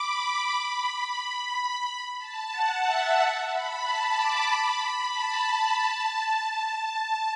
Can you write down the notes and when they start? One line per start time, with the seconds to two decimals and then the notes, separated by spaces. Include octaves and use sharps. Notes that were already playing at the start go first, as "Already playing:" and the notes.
Already playing: B5 D6
0.23 D6
0.55 B5
1.86 B5
2.19 A5
2.52 F#5
2.85 E5
3.18 F#5
3.50 B5
3.83 A5
4.16 D6
4.50 B5
5.14 A5
5.48 B5
5.81 A5
6.14 A5
6.46 A5